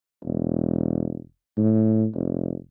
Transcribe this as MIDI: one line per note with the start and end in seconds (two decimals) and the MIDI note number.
0.24 1.21 28
1.57 2.07 45
2.14 2.55 29